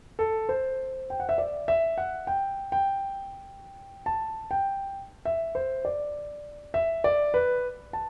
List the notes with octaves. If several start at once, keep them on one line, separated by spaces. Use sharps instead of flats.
A4
C5
G5
F#5
E5
D5
E5
F#5
G5
G5
A5
G5
E5
C5
D5
E5
D5
B4
A5